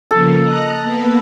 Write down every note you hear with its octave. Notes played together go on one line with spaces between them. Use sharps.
C#3 F3 A#3 A4
D#5 A#5 F#6
A#3 B3 B4